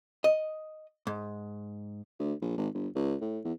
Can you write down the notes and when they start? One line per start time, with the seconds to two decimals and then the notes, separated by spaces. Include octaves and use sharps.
0.24 D#5
1.07 G#2
2.19 D2
2.42 A#1
2.57 G#1
2.74 G1
2.95 C#2
3.21 A2
3.44 E2